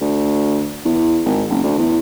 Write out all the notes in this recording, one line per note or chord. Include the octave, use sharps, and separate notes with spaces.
D2
E2
G#1
F#1
D2
E2